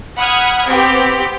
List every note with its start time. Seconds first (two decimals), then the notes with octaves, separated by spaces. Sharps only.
0.18 F#5 B5 D#6 F6 F#6 G#6
0.68 B3 C4 G4